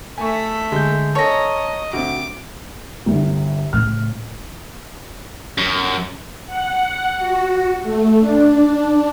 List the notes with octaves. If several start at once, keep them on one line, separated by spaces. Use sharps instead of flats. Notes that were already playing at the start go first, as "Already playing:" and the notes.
A3 E5 G#5 C#6
D3 G#3 G6
C#4 A4 C#5 D#5 A5 A#5
D2 C4 F#4 D6
G1 C2
A2 C#3 F6
F#2
F#5
F#4
A3
D4